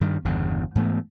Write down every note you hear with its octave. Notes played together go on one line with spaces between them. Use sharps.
G2 D#3 G3
G1 E2 G2 C#3
G#2 E3 A3 B3